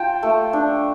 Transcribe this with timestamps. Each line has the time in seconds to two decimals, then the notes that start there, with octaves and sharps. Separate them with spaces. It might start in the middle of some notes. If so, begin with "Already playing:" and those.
Already playing: F4 G5 A5
0.23 A3
0.53 D4